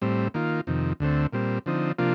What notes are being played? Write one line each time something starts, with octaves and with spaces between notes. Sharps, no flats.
A2 G3 C4
D#3 A#3 F4
F2 C3 D#3
D2 D3 A3 C4
A#2 G3 C4
D3 F3 C4 D#4
C3 F3 A#3 D4 F4